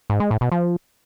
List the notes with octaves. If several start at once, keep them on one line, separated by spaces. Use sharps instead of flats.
G#2
G#3
A2
B2
F3